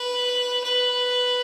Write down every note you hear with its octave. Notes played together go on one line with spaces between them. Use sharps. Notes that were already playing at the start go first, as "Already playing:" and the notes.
Already playing: B4
B4